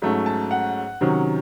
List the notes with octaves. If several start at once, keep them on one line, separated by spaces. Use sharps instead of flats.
G#2 F#3 A3 C#4
A5
F#5
C3 D#3 F#3 C#4